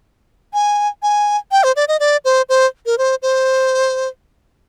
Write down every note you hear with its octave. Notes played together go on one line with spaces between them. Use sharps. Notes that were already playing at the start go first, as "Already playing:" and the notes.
G#5
G#5
G5
C5
D5
D#5
D5
C5
C5
A#4
C5
C5